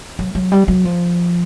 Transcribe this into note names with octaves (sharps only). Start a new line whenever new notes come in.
F#3
F#3
G3
F#3
F3